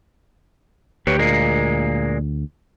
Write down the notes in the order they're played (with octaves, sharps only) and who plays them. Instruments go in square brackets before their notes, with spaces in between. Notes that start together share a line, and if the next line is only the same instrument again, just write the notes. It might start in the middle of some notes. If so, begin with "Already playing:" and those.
[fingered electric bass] D2 [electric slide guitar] G4 B4 C#5
[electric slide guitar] A#2 G#3 A#3